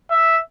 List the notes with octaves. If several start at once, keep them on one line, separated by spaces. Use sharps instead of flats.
E5